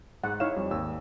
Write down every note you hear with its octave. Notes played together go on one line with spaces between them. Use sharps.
G#2 G#3 F#5
D#4 E4 C#5 F5 E7
F2 G3
G#1 D#2 E6